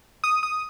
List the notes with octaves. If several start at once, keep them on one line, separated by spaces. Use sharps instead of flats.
D#6
D#6